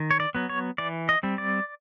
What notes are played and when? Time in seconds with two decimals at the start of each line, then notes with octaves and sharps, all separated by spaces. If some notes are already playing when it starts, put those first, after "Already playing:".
Already playing: D#3
0.11 C#5
0.20 D5
0.35 F#3 B3
0.49 C#5
0.78 E3 D5
1.09 D#5
1.23 G3 C4
1.38 D5